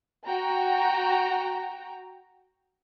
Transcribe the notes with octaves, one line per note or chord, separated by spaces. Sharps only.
F#4 G5 A#5